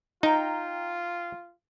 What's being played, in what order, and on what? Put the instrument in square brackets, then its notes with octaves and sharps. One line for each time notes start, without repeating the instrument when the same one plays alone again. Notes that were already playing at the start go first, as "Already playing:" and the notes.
[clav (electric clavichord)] D#4 [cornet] F4 [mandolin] G5 A#5